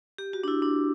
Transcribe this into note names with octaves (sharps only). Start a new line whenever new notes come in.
G4
F#4
D4
E4
D4